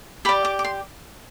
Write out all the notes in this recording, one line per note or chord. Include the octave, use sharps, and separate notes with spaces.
G4 D5 B5
D6
D6
C6